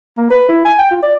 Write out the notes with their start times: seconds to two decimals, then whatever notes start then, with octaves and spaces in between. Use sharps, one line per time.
0.17 A#3
0.30 B4
0.49 E4
0.65 G#5
0.79 G5
0.91 F4
1.03 D5